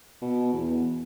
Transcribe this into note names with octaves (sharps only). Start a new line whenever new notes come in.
B2
E2